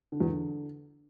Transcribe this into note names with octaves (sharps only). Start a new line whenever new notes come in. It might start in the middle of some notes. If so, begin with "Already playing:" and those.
D3
E2
D3